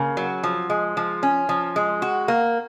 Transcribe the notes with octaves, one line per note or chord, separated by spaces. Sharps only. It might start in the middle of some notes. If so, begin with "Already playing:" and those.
Already playing: C#3 A#3
F#3
F3
G#3
F3
C#4
F3
G#3
F#4
A#3